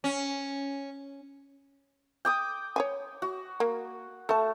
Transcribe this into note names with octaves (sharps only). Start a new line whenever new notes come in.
C#4
G5 D6 D#6
C#5 F5 G#5
F#4
A#3
A3 A4 A5